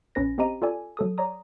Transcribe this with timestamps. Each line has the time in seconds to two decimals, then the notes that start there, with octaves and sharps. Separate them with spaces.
0.15 A#1 C#4 B4 A#6
0.38 C4 G4 D#5 A#5 D#7
0.62 F4 A4 D5 G#5
0.97 F#3 A4 D#6
1.18 C#5 D5 A#5 D#6